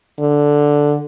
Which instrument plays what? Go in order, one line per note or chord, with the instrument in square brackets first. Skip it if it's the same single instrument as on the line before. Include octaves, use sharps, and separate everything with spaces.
[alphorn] D3